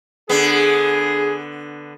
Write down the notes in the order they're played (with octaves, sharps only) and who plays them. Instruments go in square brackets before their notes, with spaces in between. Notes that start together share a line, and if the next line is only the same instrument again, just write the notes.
[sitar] D3 B3 [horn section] G#4